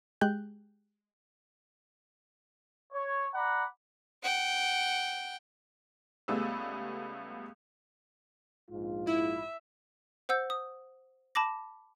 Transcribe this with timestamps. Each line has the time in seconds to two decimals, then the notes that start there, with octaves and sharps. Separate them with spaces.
0.21 G#3 G4 F#6 G6
2.93 C#5
3.34 D5 F#5 A#5 B5
4.23 F#5 G5
6.28 C#2 G3 A3 B3 G#4 E6
8.70 A#1 G#2 F4
9.07 E4 E5
10.29 C5 F#5 E6 G6
10.50 D#6
11.35 A5 B5 D6 A#6